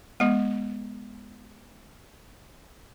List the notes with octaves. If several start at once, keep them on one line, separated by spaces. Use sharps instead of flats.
G#3 B3